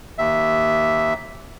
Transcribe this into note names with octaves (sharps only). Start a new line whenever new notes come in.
D#2 E5